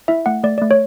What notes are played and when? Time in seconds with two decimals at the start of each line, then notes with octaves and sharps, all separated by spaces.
0.08 E4 E5
0.26 A3 F#5
0.44 A3 D5
0.58 A3 D5
0.71 C#5